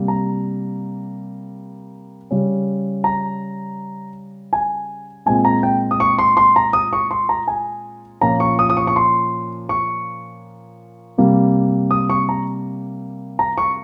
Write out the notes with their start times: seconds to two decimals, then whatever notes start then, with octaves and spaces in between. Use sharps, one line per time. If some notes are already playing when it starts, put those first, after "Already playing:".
Already playing: C3 G3 A#3
0.08 A#5
2.31 C#3 G3 C#4
3.04 A#5
4.53 G#5
5.26 A#2 G#3 C4 G#5
5.45 A#5
5.63 G5
5.91 D#6
6.00 C#6
6.19 C6
6.37 C6
6.56 A#5
6.73 D#6
6.93 C#6
7.11 C6
7.29 A#5
7.48 G#5
8.21 A#2 F3 A#3 C#4 A#5
8.40 C#6
8.59 D#6
8.70 D#6
8.77 C#6
8.87 C#6
8.96 C6
9.69 C#6
11.18 C3 G3 A#3
11.91 D#6
12.10 C#6
12.29 A#5
13.39 A#5
13.58 C#6